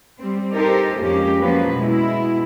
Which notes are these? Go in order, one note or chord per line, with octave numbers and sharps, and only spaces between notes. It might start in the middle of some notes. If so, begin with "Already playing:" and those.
G3 C4
D#4 G4 A4 A#4 C5
F2 G#3 A#3 C#4 G4
F3 F#3 A#3 C#4 B4
B2 G#3 E4